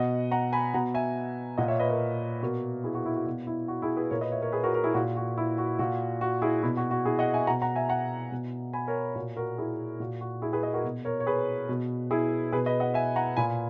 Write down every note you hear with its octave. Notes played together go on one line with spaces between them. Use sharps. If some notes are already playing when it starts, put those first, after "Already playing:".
Already playing: B2 D#5 F#5
F#5 A#5
G#5 B5
B2 F#5 A#5
E5 G#5
A#2 D#5 F#5
C#5 E5
B4 D#5
A#4 C#5
B2 F#4 A#4
E4 G#4
F#4
E4
F#4
B2 F#4
E4
F#4
E4 G#4
G#4 B4
A#2 A#4 C#5
B4 D#5
C#5 E5
A#4 C#5
G#4 B4
F#4 A#4
F#4 A#4
E4 G#4
A#2 F#4
F#4
E4
F#4
A#2 F#4
F#4
E4 G#4
B2 E4
F#4
F#4
E4 G#4
D#5 F#5
E5 G#5
B2 F#5 A#5
F#5 A#5
E5 G#5
F#5 A#5
B2
G#5 B5
A#4 C#5
A#2 F#4 A#4
F#4 A#4
E4 G#4
A#2 F#4
F#4
E4 G#4
G#4 B4
B4 D#5
F#4 A#4
B2
A#4 C#5
C#5
G#4 B4
B2
E4 G#4
B2 G#4 B4
B4 D#5
D#5 F#5
E5 G#5
F#5 A#5
A#2 G#5 B5